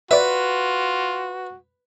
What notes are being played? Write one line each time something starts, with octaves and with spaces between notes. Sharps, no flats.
F4 F#4 B4 D5 E5